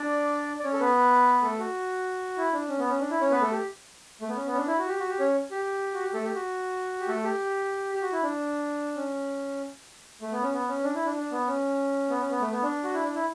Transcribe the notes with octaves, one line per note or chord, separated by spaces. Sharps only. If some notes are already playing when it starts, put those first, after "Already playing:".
Already playing: D4 D5
D5
C#4 C#5
A4
B3 B4
A3 A4
F#4
E4
D4
C#4
B3
C#4
D4
E4
C#4 C#5
B3 B4
A3 A4
G4
A3
B3
C#4
B3
C#4
D4
E4
F#4
G4
F#4
G4
C#4 C#5
G4
F#4
G4
A3 A4
G4
F#4
G4
A3 A4
G4
G4
F#4
E4
D4
C#4
A3
B3
C#4
B3
C#4
D4
E4
D4
D4
B3
C#4
B3
C#4
B3
A3
B3
D4
F#4
E4
D4
E4